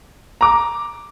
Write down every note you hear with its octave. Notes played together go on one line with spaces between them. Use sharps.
A#5 D6